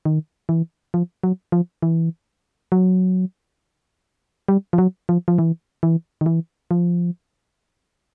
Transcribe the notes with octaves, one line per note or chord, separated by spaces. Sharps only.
D#3
E3
F3
F#3
F3
E3
F#3
G3
F3
F#3
F3
F3
E3
E3
D#3
E3
F3